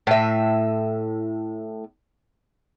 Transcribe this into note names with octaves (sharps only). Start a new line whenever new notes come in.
A2 E5